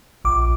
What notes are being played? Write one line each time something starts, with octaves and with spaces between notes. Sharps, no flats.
A#1 D6